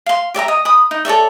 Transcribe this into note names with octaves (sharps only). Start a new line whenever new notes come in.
F5 C6
G4 D5 E5 A#5
D#5
B5 D#6
D#4
A4 C#5 D5 E5